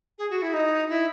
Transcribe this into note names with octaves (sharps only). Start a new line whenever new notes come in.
G#4
F#4
E4
D#4
E4